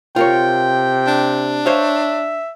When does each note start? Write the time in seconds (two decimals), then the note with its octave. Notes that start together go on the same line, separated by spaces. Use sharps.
0.16 C3 F4 A#4 C#5 G5
1.07 D4
1.66 C5 C#5 E5 F5